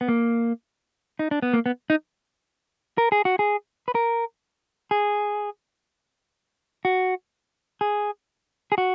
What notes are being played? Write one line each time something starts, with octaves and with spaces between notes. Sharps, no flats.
B3
A#3
D#4
D4
B3
A#3
B3
D#4
A#4
G#4
F#4
G#4
B4
A#4
G#4
F#4
G#4
G#4
F#4